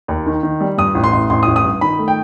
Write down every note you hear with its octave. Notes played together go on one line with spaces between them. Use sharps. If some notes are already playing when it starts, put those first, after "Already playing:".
D#2
D#3
D#3
G3
G2 D#6
A1
C6
A1
A1 C6
D#6
A1
D#6
G2
D#3 B5
A3
G5